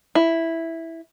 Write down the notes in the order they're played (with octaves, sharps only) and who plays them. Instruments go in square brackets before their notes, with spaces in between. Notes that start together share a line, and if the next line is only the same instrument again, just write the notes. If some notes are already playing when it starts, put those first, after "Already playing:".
[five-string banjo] E4